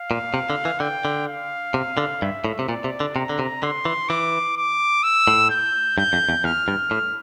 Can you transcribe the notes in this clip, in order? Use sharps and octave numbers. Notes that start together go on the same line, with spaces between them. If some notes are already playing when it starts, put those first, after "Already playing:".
Already playing: F5
A#2
C3
D3
E3
D3 G5
D3
F5
C3
D3
G2 E5
A2
C3
A#2 D5
C3
D3
C3 A#5
D3
C3
D3 C6
E3
E3 D6
D6
E6
A2
G6
G2 G6
F2
E2
E2 F6
G2
A2